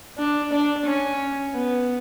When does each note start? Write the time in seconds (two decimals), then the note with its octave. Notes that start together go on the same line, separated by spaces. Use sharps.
0.18 D4
0.52 D4
0.86 C#4
1.53 B3